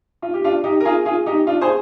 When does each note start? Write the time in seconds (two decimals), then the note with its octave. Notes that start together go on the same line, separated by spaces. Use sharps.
0.22 F4
0.34 G4
0.44 D4 F4
0.64 D#4 G4
0.80 A#4
0.85 F4 G#4
1.05 F4 G#4
1.26 D#4 G4
1.47 D4 F4
1.61 G#4 C5